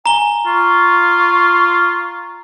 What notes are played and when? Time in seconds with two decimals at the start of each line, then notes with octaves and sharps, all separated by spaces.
0.06 G#5 A#5 G7
0.46 F4 C#6